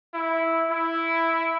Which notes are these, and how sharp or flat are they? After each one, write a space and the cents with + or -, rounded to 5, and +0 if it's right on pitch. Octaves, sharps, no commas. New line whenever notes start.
E4 -10
E4 +0